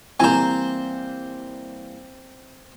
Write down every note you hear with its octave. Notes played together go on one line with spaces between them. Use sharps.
E3 G3 A#3 C4 C5 G#5 A#5